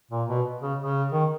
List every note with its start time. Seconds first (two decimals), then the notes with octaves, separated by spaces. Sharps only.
0.12 A#2
0.29 B2
0.62 C#3
0.79 C#3
1.12 D#3